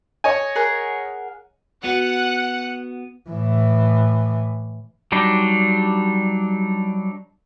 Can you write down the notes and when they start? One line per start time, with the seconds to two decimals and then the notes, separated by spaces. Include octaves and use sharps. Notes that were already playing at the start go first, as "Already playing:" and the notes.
0.24 C#5 D#5 G#5
0.55 G#4 A#4 F#5
1.84 B3 F#4 F#5
3.30 A2 E3
5.12 F#3 G3 D4 D#4